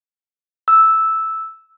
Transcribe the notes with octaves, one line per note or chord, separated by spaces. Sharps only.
E6